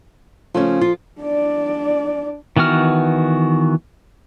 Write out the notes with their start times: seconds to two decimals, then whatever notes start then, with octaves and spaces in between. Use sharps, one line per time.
0.54 C#3 F3 A3 C#4
0.81 F4
1.21 D4 D5
2.56 D#3 E3 B3 F#4 F6